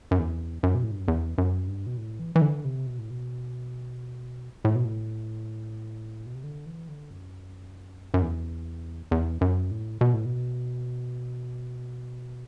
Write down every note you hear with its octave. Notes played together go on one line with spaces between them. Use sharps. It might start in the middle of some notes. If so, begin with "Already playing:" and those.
F#2
E2
F#2
B2
A2
G2
F#2
E2
F#2
G2
B2
A2
E3
E3
D3
C3
B2
A2
B2
A2
B2
A2
B2
C3
D3
E3
D3
F#2
F#2
E2
E2
F#2
A2
B2
A2
B2